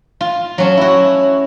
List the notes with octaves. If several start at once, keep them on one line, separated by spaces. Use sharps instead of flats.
F4
F#3 C#4 A5
E4 F#4